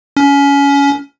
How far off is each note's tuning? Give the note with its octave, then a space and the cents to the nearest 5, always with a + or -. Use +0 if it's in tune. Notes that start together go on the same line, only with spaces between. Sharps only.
C#4 +25